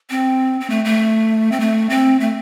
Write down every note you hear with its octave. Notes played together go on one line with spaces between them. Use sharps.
C4
C4
A3
A3
C4
A3
C4
A3